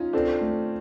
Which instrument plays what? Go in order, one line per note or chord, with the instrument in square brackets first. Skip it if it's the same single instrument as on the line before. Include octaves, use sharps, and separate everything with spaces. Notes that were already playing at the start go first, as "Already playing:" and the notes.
Already playing: [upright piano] C#4 D#4 [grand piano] F4
[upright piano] C4 D4 [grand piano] A4
[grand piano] A3